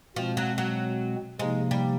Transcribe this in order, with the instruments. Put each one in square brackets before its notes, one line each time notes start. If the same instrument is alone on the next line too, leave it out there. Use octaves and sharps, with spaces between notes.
[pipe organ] B2 G#3 C4 [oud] F3
[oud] F#3
F#3
[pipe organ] C3 F3 A#3 D#4 [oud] G#3
[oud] G3